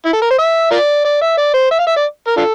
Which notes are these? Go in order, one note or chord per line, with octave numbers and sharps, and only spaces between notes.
E4
A4
A#4
C5
E5
F4 A#4 D5
D5
E5
D5
C5
E5
F5
E5
D5
A#4
D4 F4 A4